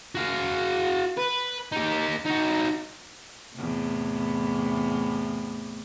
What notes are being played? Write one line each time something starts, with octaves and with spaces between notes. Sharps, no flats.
F#4 F5
B4
D#4 G4
D#4 F#4
E2 A2 C3